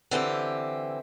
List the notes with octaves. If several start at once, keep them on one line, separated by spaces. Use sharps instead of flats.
D3 E3 C4 G4